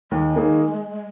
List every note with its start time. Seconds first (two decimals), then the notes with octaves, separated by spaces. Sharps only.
0.11 D#2 G#3
0.35 D#3 A#3 D#4 G#4